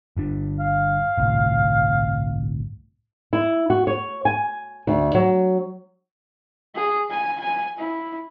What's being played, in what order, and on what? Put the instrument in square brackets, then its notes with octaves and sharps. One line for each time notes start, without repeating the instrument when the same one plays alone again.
[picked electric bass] G1 G2 D4
[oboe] F5
[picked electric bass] G1 C2 A2
[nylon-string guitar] E4
F#4
C#5
G#5
D2
F#3
[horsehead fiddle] G#4
G#5
G#5
E4